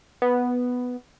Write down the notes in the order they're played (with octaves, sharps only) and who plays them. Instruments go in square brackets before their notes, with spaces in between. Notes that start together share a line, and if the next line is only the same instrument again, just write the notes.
[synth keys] B3